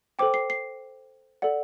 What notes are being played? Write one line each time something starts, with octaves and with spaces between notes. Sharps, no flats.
A4 C5 G5 D6
C7
C7
A4 D5 F#5